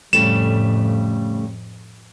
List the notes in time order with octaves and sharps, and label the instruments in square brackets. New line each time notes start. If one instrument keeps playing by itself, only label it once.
[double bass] F2 A2 [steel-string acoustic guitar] C#3 G3 A3 [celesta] E7